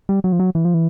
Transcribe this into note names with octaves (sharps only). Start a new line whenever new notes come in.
G3
F#3
F3
F#3
E3
F3
E3